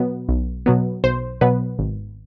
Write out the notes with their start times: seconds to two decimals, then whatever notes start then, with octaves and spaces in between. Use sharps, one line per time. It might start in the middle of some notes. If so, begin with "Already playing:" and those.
Already playing: B2 F#3 B3
0.29 B1
0.66 B2 F#3 B3
1.04 B1 C5
1.41 B2 F#3 B3 B4
1.79 G#1